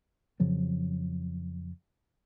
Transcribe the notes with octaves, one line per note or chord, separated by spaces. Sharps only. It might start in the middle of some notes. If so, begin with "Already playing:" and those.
F2 C#3 F3 F#3